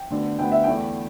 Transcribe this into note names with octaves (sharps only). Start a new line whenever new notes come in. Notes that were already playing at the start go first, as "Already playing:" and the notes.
Already playing: G5
D2 D3 B3
D2 D3 B3 G5
E5
E2 E3 A3 G5